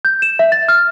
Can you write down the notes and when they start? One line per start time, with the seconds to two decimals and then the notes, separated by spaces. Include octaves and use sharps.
0.05 G6
0.22 E7
0.39 E5
0.52 A6
0.69 F6